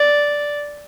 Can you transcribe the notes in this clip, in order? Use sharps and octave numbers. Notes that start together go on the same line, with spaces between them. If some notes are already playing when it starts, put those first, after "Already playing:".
Already playing: D5